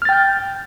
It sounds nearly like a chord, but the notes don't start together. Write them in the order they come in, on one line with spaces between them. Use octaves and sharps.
F6 A6 G5 G6